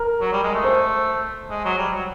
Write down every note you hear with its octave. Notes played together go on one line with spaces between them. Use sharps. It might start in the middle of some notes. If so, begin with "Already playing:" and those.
Already playing: A#4
F#3
G3
G#3
A3
C5
G#3
F#3
G3
F#3